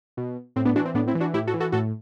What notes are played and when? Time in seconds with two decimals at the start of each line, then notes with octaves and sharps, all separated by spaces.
0.17 B2
0.56 A2 C4
0.65 B3 D4
0.76 E3 D4 F#4
0.85 C4
0.94 A2 B3 D4
1.08 C4 E4
1.15 E3
1.20 D4 F#4
1.34 A2 E4 G4
1.47 F#4 A4
1.54 E3
1.60 F#4 A4
1.72 A2 F#4 A4